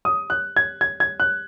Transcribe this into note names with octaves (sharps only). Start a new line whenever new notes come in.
D#6
F#6
G#6
G#6
G#6
F#6